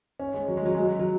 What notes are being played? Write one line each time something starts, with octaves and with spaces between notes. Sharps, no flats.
C#4
G#3
F#3
G#3
F#3
G#3
F#3
F#3